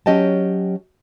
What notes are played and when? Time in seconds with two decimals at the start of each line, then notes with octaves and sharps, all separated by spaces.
0.06 F#3 C#4 G4 D#5 G5 A5